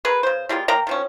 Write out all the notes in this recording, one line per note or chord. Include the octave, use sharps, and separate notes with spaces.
G#4 A#4 B4
C#3 C5
G3 G#3 A#3 F4
A#3 A#4 G5 A#5
D#3 F3 C#4